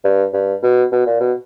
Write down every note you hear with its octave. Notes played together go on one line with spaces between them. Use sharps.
G2
G2
B2
B2
A#2
B2